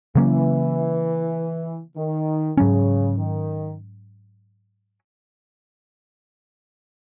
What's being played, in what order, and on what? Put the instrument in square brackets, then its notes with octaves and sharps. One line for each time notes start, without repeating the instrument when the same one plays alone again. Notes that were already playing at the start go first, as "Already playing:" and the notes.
[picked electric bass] C#3 F#3 A#3 C#4 [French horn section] E3
[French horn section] D#3
[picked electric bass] G#2 F#3 C#4 [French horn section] C#3
[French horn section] D#3